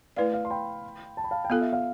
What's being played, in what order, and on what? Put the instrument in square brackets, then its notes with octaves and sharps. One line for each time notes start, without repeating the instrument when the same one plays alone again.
[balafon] A3 E4 B4 D5 [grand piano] F5
[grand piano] F5
C6
G5 B5
A5
B5
F5 A5
G5
[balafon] B3 F4 A4 [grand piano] F5
[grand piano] E5
F5